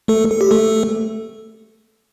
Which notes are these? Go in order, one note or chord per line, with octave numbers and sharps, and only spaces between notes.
A3 A4
A4
G4
A3 A4